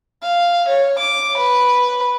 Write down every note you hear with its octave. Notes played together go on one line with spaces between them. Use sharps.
F5
C#5
D6
B4